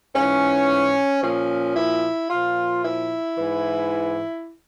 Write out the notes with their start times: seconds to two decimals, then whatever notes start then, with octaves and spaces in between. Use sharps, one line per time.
0.14 G#2 E3 C#4
1.22 A#2 F3 C#4
1.75 E4
2.29 A#2 F3 F4
2.83 E4
3.36 G#2 E3